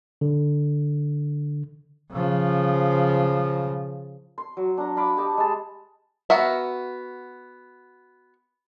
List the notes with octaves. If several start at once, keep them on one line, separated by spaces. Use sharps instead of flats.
D3
C#3 F3
C6
F#3
D4 A#5
D5 F5 B5 D6
G4 D#5 A5
G#3 A5
B3 F#4 A#4 E5